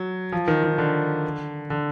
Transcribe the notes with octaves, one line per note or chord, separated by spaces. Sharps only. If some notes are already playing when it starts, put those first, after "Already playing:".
Already playing: F#3
F3
D#3
D#3
D3
D3